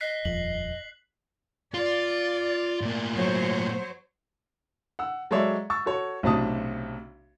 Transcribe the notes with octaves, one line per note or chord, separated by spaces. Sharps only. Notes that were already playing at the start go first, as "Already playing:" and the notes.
D#5 F#6 B6 C7
D#1 F2 F#7
F4 D5
A2 A#3
F#3 C5 C#5
F#5 E6
F#3 G#3 A4 C#5 D5 E5
C#6 E6 A6
F#4 A4 C#5
B1 A2 C3 D4 A5 D#6